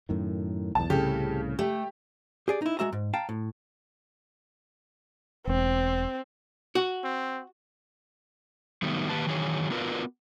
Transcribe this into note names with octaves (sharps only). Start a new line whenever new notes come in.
F#2 A2 D#3
B1 E2 A5
C2 A2 C#3 G4 A4
A3 G4
G4 G#4 D5
D#4 E4
G#3 F#4 E5 A#5
G#2
F5 G5 A5 A#5
A2
E1 C4
F#4
C4
D#3 F#3 G3 A3 B3 D#4
D#3 A#3 G4 B4 A5
D#3 E3 F#3 G#4 C#5
B3 D4 F4 F#4 A#4 B4